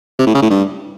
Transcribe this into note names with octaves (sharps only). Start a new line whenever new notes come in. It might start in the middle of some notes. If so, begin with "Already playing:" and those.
C3
A2
C#3
A2
G2